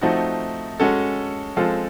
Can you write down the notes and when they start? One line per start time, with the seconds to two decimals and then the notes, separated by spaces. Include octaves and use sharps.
0.01 F3 A3 C4 D#4 F#4
0.80 G#3 C#4 F#4 A4
1.56 F3 G#3 C4 F4 A4